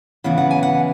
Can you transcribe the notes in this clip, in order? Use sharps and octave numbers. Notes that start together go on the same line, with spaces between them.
C#3 E3 B3 E4 F#5
F#5
G#5
F#5